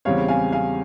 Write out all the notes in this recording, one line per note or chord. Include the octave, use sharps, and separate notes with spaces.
E2 C#3 G3 C4 C#5 F5
F5 G#5
F5 G#5